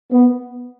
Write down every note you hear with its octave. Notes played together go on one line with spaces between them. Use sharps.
B3